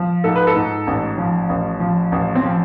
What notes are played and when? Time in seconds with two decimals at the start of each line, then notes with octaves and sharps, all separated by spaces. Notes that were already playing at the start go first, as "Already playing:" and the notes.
Already playing: F3
0.24 G#2 A4
0.36 B4
0.47 A4
0.55 G#2
0.87 A1
1.18 F3
1.49 A1
1.80 F3
2.12 A1
2.35 C4
2.43 F3